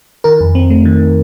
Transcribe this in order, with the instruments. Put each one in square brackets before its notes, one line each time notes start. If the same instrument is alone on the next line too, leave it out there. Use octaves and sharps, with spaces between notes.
[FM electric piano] D#3 A#4
F2
C4
A3
D#3